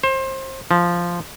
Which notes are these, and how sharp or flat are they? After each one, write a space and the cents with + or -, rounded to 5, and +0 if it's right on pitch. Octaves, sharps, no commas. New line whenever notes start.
C5 +25
F3 -5